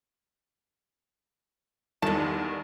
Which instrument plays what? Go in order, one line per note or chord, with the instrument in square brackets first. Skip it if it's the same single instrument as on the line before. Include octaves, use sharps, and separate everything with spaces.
[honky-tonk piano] E2 G2 D#3 [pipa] D3 A5